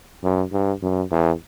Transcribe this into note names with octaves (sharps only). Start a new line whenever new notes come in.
F#2
G2
F#2
E2